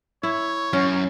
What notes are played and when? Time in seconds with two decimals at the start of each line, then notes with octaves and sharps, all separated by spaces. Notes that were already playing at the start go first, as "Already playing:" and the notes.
0.23 E4 C#5
0.73 F#2 C#4